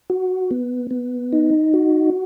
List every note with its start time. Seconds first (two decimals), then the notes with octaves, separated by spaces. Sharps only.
0.10 F#4
0.51 B3
0.91 B3
1.33 D#4
1.74 F#4